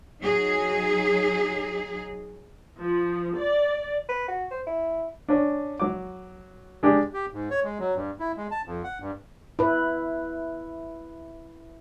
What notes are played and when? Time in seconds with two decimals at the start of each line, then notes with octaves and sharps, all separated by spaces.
0.21 F#3 D#4 G#4
2.79 F3
3.36 D5
4.09 B4
4.28 F#4
4.51 C5
4.67 E4
5.28 C#4 D4
5.80 F#3 D6
6.83 G#3 D4 G4
7.13 G4
7.33 G#2
7.51 C#5
7.64 G#3
7.79 F#3
7.95 G2
8.20 E4
8.37 G#3
8.51 A5
8.66 F2
8.84 F#5
9.00 G2
9.59 E4 B4